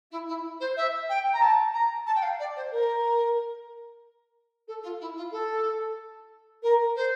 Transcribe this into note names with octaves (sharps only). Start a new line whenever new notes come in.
E4
E4
C5
E5
G5
A#5
A5
A#5
A5
G5
F5
D5
C5
A#4
A4
F4
E4
F4
A4
A#4
C5